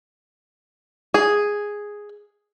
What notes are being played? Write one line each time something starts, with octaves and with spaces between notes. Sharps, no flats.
G#4